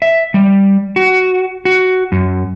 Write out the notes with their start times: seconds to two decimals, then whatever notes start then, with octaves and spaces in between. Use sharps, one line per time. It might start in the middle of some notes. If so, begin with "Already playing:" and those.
0.02 E5
0.34 G3
0.96 F#4
1.65 F#4
2.12 F#2